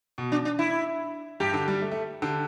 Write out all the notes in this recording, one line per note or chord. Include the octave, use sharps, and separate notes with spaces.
B2
D4
D4
E4
G2 G4
D3
G3
A3
A3
D3 G4